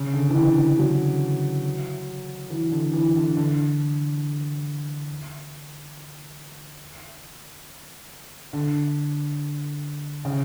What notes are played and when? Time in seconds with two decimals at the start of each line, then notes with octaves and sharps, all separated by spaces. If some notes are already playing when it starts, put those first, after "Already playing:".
Already playing: C#3
0.14 D3
0.30 E3
0.35 D3
0.58 E3
0.79 F#3
2.50 E3
2.72 D3
2.93 E3
3.16 D3
3.37 D3
8.53 D3
10.25 C#3